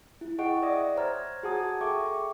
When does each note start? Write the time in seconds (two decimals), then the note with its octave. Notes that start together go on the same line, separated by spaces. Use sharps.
0.21 E4
0.38 G#4 D#5 F#5 G5 C#6 D7
0.62 D5 E5 D#6 A#6
0.97 C5 C#5 A#5 F6 G#6 A6
1.43 F#4 G#4 F#5 A5 D#6 G#6
1.81 G#4 A4 E5 G5 C#6 D6